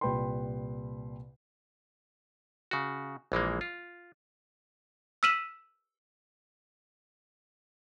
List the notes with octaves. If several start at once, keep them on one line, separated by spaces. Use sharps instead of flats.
C2 A#2 B4 G5 B5 C6
C#3 F#4
A#1 E3 G#3 A#3
F4
E6 F6 B6 D#7 E7 F#7